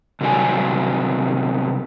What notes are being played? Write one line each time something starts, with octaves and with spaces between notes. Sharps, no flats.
C3 D#3 F#3 G3 D5 G#5